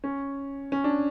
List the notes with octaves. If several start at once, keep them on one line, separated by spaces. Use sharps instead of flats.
C#4
C#4
D4